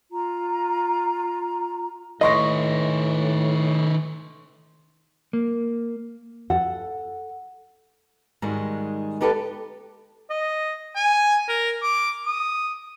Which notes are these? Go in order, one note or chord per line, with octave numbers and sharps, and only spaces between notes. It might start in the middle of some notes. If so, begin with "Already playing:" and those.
F4 A#5
A2 D#3 B4 D#5 C6 C#6 A#6
A#3
A4 F#5
G#2 D#3 G3 G#3 F#4
B3 D#4 G4 A4 B4
D#5
G#5
A#4
D6
D#6